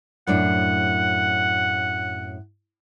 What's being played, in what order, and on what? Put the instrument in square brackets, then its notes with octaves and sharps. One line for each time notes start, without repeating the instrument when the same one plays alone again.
[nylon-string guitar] F#2 A2 D4 [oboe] F#5